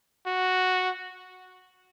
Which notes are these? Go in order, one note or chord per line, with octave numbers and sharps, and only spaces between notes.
F#4